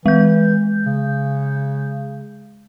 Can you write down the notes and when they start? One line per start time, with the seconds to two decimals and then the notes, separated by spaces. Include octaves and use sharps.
0.06 E3 G#3 G6
0.86 C#3